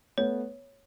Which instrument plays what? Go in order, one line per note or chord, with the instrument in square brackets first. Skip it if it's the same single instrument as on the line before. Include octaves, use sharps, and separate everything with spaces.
[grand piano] A3 B3 [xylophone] C#5